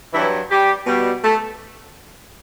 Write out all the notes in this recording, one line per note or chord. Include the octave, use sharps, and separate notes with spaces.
G2 E3 F#3 E4
G3 G4
B2 G3
A3 A4